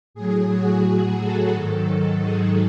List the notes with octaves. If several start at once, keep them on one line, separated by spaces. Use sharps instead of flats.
A2 F#3 G#4
F#4
G#4
A4
G#2 D#3 F#3 A4
G#4